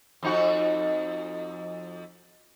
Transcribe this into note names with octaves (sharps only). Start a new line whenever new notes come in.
F2 D#4 F#4